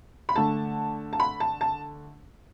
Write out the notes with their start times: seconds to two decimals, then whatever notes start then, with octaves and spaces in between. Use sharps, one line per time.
0.29 B5
0.36 D3 A3 A5
1.13 A5
1.20 B5
1.40 A5
1.61 A5